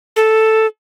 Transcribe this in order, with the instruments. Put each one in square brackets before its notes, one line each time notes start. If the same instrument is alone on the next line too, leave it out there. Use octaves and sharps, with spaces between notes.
[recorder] A4